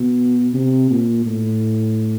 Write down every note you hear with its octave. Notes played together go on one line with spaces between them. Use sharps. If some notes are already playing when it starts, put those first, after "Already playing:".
Already playing: B2
C3
A#2
A2